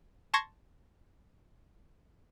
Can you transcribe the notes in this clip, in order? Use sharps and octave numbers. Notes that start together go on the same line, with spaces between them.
A5 C6 C#6 G#6 A#6